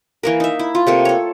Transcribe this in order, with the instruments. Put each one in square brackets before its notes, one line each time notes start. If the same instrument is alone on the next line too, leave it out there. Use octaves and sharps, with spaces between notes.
[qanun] E3 A#3 A#4
D#4 E5
E4
F4
C3 A3 A#3
A4 C#5